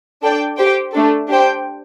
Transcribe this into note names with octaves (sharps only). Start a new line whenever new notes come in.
D4 A4 D5 G5
G4 C5 G5
A3 D4 A4
D4 G4 C5 G5